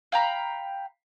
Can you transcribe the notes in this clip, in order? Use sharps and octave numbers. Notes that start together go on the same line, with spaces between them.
F5 G5 A#5 B5